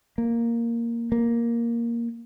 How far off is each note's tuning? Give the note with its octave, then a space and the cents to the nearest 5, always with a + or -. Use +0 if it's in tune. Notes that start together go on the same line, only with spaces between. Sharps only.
A#3 +0
A#3 +5